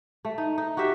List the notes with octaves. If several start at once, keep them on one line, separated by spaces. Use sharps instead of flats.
A3
D#4
D#4
F#4 G4 C#5 E5